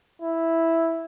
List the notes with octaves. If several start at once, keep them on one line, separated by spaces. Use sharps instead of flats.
E4